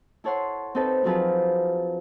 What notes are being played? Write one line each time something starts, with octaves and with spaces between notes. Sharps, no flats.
E4 A4 C#5 F#5 C6
C4 D#4 A4 B4
F3 F#3 C4 F4 G#4 B4